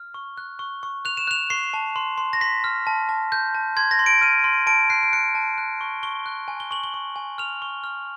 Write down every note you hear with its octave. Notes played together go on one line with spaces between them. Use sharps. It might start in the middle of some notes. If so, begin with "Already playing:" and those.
Already playing: F6
C#6
F#6
C#6
C#6
F#6 F7
E7
F#6 F7
C#6 C7
A5
C6
C6
A#6
C6 B6
F6
A5
A5
G6
A5
C6 G#6
A#6
C6
D7
F6 D#7
C6
A5 D7
F#6 C7
D7
F#6 C#7
A5
F#6
C#6
C#6 G7
F#6
G#5
G7
C#6 F#7
G7
C#6
G#5
F6 F7
C#6
F6